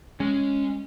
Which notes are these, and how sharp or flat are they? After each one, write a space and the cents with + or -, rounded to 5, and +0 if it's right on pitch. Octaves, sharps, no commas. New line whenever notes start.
G#3 +0 C#4 +0